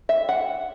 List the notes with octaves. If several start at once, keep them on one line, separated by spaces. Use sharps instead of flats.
E5
F#5